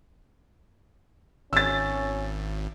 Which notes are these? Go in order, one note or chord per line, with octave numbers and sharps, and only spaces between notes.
G#1 C#4 E6 A6